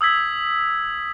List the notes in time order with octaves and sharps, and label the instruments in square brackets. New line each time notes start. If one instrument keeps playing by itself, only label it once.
[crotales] D#6 E6 G#6 B6